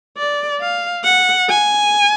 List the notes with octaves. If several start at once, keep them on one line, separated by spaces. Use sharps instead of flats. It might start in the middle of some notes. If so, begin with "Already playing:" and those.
D5
F5
F#5
G#5